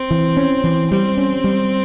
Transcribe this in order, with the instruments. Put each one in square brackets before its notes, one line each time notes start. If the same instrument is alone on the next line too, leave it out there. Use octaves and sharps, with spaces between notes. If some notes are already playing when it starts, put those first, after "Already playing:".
Already playing: [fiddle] C4
[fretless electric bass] E3
C#4
E3
[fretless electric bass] G3 [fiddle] C4
[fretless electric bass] C#4
G3